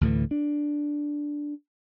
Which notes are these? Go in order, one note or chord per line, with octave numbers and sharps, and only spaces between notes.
D2 A2 D3 E3
D4